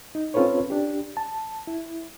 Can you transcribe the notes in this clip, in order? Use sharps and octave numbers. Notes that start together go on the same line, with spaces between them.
D#4
C4 C#4 F4 A4 B4 C#5
D4 G4
A5
E4